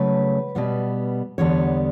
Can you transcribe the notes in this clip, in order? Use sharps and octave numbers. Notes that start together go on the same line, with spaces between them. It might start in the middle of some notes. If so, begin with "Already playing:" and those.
Already playing: C#3 F#3 A3 B4
B2 G3 B3
E2 D3 G3 B3 C#5